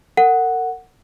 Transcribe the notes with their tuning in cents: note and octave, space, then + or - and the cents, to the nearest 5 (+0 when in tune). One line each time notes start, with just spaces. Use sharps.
A#4 -40 F#5 +0